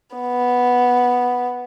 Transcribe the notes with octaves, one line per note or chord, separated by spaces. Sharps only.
B3